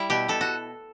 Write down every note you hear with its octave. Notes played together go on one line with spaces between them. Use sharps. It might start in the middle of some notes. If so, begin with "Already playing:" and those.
Already playing: G3 E4
B2 G4
B2 A4
F#4